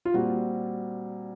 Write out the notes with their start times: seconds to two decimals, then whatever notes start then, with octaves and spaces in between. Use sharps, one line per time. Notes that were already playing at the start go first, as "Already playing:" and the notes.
0.05 F4
0.14 A#2 G3 C4 F#4